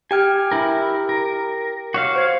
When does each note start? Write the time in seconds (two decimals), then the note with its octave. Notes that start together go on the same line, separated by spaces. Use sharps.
0.11 G4 G5 G#5 F6
0.52 E4 A#4
1.09 A#4
1.94 F#4 C#5 F5
2.16 C5 G#6